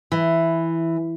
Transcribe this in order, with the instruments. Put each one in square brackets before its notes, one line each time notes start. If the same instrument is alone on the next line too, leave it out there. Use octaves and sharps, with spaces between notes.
[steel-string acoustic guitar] E3